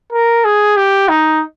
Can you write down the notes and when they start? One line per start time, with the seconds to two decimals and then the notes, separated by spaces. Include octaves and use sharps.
0.13 A#4
0.45 G#4
0.77 G4
1.09 D#4